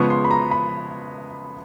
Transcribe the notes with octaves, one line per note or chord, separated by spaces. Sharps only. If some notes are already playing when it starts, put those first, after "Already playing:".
Already playing: C#3 F3 G#3 B3 C#6
C6
B5
A#5
B5